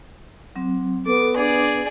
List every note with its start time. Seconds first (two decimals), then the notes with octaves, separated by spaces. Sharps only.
0.56 F#3 C4
1.06 B3 A4 D6
1.37 D4 G#4 D5 D6